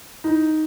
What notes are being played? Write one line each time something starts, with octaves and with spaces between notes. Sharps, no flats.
D#4